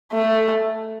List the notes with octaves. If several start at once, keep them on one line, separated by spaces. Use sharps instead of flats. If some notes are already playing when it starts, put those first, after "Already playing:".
A3